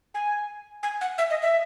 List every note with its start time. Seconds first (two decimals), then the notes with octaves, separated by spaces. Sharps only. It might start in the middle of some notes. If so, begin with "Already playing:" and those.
0.14 G#5
0.83 G#5
1.01 F#5
1.18 E5
1.30 D#5
1.42 E5